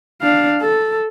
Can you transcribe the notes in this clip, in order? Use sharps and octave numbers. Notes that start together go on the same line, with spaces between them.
D4 F5
A4